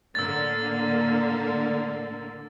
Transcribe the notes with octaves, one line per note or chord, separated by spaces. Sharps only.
A2 D3 A#3 E6 A6